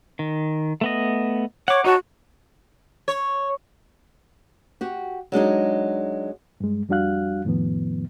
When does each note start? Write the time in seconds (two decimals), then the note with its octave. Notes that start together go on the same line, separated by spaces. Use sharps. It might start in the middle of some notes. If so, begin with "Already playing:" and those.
0.19 D#3
0.81 A3 B3 D#5
1.68 C#5 F#5 D6
1.84 D#4 F#4 C#5 A5
3.08 C#5
4.81 F#4 G4
5.32 F#3 G#3 D4 D#4
6.60 G2 G#3
6.89 F2 G3 D4 F#4 F5 F#6
7.45 F2 A2 D#3 F3 B3